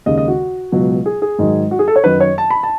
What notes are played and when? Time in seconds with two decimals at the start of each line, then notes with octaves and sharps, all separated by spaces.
0.06 D#2 C#3 G#3 D#5
0.18 D#5
0.28 F#4
0.72 C#2 B2 F#3
1.06 G#4
1.22 G#4
1.39 G#2 D#3 F#3
1.71 F#4
1.79 G#4
1.88 A4
1.96 C#5
2.04 F#2 D#3 F#3 B4
2.20 C#5
2.38 A5
2.50 B5
2.63 A5